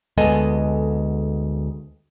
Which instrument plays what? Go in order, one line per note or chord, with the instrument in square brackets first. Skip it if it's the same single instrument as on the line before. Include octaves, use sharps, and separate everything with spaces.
[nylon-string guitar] D2 G#3 B3 A4 D#5 G#5